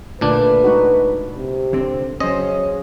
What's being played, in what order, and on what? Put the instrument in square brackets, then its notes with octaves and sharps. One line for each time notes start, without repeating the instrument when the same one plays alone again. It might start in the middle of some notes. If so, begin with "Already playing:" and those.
[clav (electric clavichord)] A#2 D4 [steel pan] D3 A3 [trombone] B4
[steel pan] G#3 D#4 F#4
[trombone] C3
[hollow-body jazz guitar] D3 C4
[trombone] C#3 [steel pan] F#3 C5 [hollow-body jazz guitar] C#4 [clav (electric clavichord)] D#5